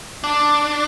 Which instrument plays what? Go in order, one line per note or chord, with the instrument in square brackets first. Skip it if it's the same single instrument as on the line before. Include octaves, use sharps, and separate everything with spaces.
[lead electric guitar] D4